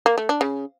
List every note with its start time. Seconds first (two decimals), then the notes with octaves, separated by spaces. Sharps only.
0.06 A#3
0.18 A3
0.29 D4
0.41 C#3